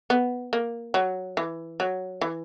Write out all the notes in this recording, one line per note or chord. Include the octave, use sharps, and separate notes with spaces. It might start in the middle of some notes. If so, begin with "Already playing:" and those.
B3
A#3
F#3
E3
F#3
E3